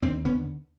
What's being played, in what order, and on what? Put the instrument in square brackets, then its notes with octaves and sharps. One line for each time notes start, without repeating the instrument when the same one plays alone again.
[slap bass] D#2 C4 D4
D3 B3 C#4